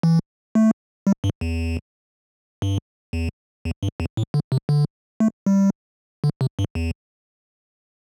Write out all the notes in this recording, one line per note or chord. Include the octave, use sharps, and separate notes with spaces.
E3
A3
G3
G2
E2
G2
E2
E2
G2
E2
A2
D3
C3
D3
A3
G3
D3
C3
G2
E2